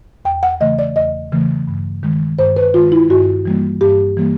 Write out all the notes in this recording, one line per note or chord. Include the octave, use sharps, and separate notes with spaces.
E2 G5
F#5
C#3 E3 A3 D#5
D5
E2 D#5
C#3 E3 A3
G2
D#3 G#3
G2 C5
B4
D#3 G#3 F4
E4
G2 F#4
E3 G3 A#3
G2 G4
E3 G3 A#3